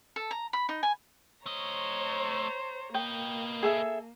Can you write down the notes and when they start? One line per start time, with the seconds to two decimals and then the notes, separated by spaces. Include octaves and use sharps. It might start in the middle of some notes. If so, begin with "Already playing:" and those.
0.16 A4
0.31 A#5
0.53 B5
0.69 D#4
0.83 G#5
1.46 A3 C5 C#5 D#5 A#5
2.94 A#3 B4 D#5 G5
3.63 G#4 A4 E5